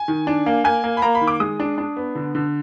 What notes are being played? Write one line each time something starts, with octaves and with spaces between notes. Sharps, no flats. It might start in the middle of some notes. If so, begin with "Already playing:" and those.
Already playing: G#5
D#3
D4
A#3
A#3 G#5
A#3
B5
A#3 A#5
B5
D#3
D6
G#3 D#6
D4
D4
B3
D3
D3